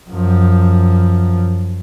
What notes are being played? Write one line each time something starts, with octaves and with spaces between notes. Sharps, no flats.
F#2 F3